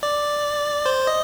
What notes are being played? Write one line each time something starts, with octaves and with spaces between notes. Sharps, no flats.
D5
C5
D#5